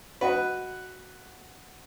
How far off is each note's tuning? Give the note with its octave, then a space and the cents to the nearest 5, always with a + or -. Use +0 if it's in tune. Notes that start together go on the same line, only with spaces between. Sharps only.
F#4 +0 B4 +0 D#5 +0